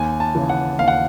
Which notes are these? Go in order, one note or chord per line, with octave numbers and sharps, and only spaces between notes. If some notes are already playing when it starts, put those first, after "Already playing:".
Already playing: D#2 G#5
A5
C#3 E3
F#5
D#2 F5
F#5